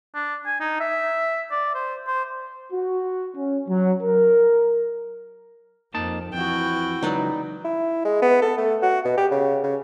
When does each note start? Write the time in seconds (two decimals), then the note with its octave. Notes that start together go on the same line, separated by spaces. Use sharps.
0.15 D4
0.46 G#5
0.60 D#4
0.80 E5
1.51 D5
1.75 C5
2.07 C5
2.73 F#4
3.37 C#4
3.69 F#3
4.03 A#4
5.94 F2 A#3 D#4 A5
6.33 F2 E3 E4 F#4 G5
7.03 C#2 F#3 D#4 B4 D5
7.65 E4
8.05 G#3
8.22 B3
8.42 A4
8.58 A3
8.82 F#4
9.05 B2
9.17 G4
9.31 C#3
9.64 C#3